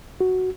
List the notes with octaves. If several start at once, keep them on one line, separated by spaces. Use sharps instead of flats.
F#4